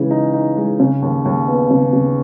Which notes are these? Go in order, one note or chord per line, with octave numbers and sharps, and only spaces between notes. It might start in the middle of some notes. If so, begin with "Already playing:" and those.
Already playing: C#3 E3 G#3
D#4
D#4
G#3
C#3
D#2
D#2
B3
C#3
C#3